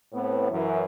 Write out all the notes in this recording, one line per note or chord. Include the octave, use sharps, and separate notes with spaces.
A2 B3 C4
F#2 E3